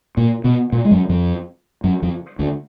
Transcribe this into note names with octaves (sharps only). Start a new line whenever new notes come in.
A#2 A#3
B2 B3
A#2 A#3
G#3
F#2 F#3
F2 F3
F#2 F#3
F2 F3
D2 D3